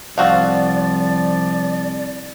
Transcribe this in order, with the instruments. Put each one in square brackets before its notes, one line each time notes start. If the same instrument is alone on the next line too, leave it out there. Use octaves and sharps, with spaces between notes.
[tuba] C2 [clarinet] F3 [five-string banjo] C4 F#4 F5 [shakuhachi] D5
[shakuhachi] D5